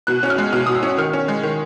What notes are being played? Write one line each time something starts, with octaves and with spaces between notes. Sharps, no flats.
B2 F#6
C#4 F#6
F6
G#3
B2 F6
B2 D#6
E6
C#4
D#3 F6
C#4
G#3
D#3